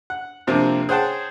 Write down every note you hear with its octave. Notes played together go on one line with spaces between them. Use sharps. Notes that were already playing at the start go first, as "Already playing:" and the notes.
F#5
G2 C3 F3 A#3 C4 F4
G#4 C5 C#5 F#5 G5 A5